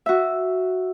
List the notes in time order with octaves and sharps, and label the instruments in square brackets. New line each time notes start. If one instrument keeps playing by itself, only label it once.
[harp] F#4 E5